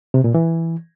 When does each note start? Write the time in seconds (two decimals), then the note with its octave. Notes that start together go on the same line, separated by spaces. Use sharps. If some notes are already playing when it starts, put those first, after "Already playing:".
0.14 C3
0.24 A#2
0.35 E3